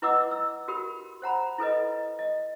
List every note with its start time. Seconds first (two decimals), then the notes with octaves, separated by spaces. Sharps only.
0.02 E4 B4 D#5 F#5 D6 E6
0.31 E6
0.68 F#4 G4 A#4 B5
1.22 C5 F#5 A#5 B5
1.58 E4 A4 B4 D#5
2.19 D#5